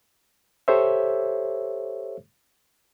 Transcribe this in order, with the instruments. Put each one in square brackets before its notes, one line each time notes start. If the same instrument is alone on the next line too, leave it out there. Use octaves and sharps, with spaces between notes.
[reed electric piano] G4 A4 C5 C#5 E5